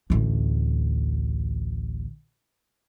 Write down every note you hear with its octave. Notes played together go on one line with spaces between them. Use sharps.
A1 D2